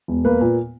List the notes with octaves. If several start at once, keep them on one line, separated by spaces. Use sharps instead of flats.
E1
A#3 B4
A#2